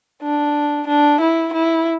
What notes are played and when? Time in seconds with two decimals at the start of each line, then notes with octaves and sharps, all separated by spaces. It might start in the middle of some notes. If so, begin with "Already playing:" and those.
0.22 D4
0.88 D4
1.21 E4
1.54 E4